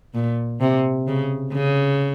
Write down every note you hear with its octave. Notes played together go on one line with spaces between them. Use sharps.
A#2
C3
C#3
C#3